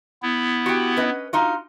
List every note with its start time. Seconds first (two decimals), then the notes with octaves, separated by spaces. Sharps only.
0.22 B3 E4
0.66 F#4 G4
0.97 C#4 B4 D#5
1.33 D#4 F4 F#4